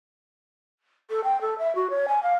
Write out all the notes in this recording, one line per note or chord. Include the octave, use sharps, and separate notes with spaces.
A4
G5
A4
E5
F#4
C#5
G#5
F5